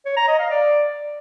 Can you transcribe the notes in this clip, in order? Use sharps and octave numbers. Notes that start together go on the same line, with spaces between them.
C#5
A#5
D#5
F5
D5